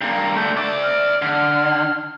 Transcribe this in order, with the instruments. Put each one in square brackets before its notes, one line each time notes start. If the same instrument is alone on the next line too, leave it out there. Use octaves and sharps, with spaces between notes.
[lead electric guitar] G2 A#3
[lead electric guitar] A3 D4 [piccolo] G6
[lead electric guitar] D5 E5 [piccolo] D6
[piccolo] F6
[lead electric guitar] D3 [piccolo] F6